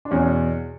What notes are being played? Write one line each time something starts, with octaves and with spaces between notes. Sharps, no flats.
D4
E2 B2 C#4